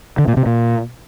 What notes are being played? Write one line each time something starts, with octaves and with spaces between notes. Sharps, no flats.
D3
A#2
C3
A#2